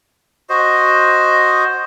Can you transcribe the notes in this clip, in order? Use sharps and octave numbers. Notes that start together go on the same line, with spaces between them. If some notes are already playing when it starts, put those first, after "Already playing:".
F#4 C5 D#5